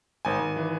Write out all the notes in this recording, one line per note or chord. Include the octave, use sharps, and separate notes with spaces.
G#1 G#5
G#1
E3